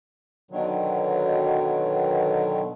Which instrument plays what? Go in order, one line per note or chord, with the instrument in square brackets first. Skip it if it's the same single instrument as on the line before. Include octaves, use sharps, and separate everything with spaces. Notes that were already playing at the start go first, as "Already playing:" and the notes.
[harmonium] B2 D3 D#3 F#3